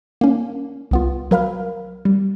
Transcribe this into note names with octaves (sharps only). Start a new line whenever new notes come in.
A#3 C#4
C2 B3 F4
F#3 A#4 F5 B5 F6
G3